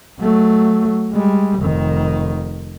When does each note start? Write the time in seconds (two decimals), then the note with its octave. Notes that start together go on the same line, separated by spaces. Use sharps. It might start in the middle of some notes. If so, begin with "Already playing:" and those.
0.20 F#3 A3
1.12 G3 G#3
1.60 F1 D#3